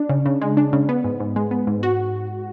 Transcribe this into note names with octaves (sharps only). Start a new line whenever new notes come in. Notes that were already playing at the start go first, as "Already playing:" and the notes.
Already playing: D4
C#3
C#3
G#3
D4
C#3
B3
G#2
G#2
G#3
B3
G#2
F#4